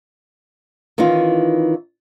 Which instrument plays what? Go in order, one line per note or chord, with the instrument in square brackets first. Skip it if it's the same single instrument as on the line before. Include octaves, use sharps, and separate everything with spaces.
[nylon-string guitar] D#3 E3 C#4 D#4 F4